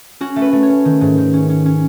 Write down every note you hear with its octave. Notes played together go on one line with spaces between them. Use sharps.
C#4 F#4
A3
B4
A3
C#5
C#4
D#3
G#2
D#3
C#4
C#4
C#4